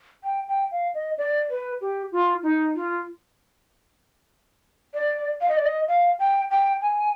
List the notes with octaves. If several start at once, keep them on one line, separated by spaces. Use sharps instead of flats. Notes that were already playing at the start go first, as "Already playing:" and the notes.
G5
G5
F5
D#5
D5
B4
G4
F4
D#4
F4
D5
F5
D#5
D5
D#5
F5
G5
G5
G#5